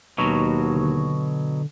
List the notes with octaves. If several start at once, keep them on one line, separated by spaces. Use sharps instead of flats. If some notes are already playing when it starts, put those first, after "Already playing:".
D#2 B2 F#3
D3